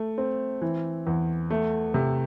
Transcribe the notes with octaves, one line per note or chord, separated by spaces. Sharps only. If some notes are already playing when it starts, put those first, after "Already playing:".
Already playing: A3
C4
E3
E2
A3
C3